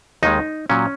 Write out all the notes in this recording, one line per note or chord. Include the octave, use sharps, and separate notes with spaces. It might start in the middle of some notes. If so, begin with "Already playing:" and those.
D#2 D#3 G#3 D#4
A#2 F#3 C#4